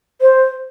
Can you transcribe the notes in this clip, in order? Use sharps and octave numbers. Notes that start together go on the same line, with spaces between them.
C5